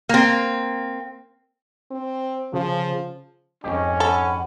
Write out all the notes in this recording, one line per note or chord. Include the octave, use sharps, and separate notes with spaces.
A#3 C4
C4
C#3 F3
F2 G#2 C#4 G4 D#5
A4 F#5 G#5 B5